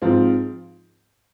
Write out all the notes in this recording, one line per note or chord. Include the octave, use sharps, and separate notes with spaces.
G#2 F3 C4 F4